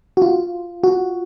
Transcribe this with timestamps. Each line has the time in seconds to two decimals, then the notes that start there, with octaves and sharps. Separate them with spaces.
0.17 F#4
0.22 F4
0.84 F#4